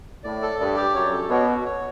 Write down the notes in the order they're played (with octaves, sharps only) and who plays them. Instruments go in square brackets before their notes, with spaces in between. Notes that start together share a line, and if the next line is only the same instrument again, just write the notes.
[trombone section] A2 [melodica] D5
[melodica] A4
[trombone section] G2 [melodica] D5
[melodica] G4
[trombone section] F#2 [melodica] C#5
[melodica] A4
[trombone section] B2 [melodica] C#5
[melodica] F#4
C#5